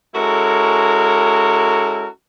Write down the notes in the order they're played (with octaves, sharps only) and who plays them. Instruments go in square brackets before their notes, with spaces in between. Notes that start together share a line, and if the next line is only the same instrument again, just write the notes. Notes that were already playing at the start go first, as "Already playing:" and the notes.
[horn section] G#3 C#4 E4 F#4 A4 A#4